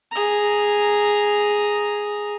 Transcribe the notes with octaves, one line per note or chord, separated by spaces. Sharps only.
G#4 A#5